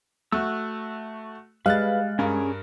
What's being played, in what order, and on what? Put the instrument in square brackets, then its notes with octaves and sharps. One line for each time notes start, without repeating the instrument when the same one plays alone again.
[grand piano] A3 F#4 [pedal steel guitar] E6 F#6
[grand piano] G3 F#6 A6 [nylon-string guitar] G#3 [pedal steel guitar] B4 [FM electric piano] F5
[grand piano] G2 A#4 [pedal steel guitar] C#4 G#4